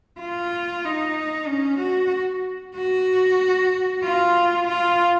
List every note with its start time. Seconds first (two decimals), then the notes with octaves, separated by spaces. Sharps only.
0.20 F4
0.85 D#4
1.48 C#4
1.79 F#4
2.76 F#4
4.04 F4
4.68 F4